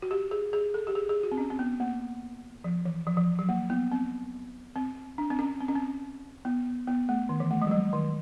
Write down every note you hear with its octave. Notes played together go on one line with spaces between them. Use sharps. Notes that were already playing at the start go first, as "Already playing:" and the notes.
F#4
G4
G#4
G#4
A4
G4
G#4
G#4
F#4
C4
C#4
C4
B3
A#3
F3
E3
F3
F3
F#3
A#3
B3
C4
C4
D4
C4
C#4
C4
C#4
C4
B3
B3
A3
D#3
E3
A3
G#3
F#3
G3
D#3